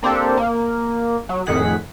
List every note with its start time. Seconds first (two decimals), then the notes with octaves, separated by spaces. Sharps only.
0.03 A#3 C4 D4 G4 A4
0.37 A#3
1.29 F#3
1.46 F2 A2 D#3 G#4 F#5 B6